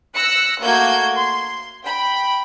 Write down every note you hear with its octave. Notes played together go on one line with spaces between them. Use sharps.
E6 F#6 A#6 C#7
A3 A#3 F#4 G6 G#6
C6
G5 B5